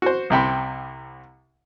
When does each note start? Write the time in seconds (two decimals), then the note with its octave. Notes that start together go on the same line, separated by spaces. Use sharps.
0.02 F#4 C5
0.30 C2 C3 G5 B5